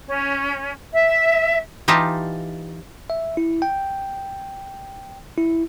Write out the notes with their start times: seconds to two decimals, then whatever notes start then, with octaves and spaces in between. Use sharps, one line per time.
0.07 C#4
0.94 E5
1.88 E3 D#4 F4 G4 A5
3.10 E5
3.37 E4
3.62 G5
5.38 E4